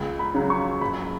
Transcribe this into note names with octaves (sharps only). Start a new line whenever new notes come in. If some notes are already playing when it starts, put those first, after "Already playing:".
Already playing: C#2
B5
C#3 F#3
C#6
F#1 B5